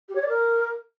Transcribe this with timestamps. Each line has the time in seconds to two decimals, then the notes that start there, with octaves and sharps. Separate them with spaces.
0.08 G4
0.15 C#5
0.22 D5
0.28 A#4